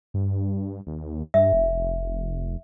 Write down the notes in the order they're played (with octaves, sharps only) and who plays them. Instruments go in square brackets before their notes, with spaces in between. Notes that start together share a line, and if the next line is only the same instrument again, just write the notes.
[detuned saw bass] G2
D#2
[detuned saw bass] G2 [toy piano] E5
[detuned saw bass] F1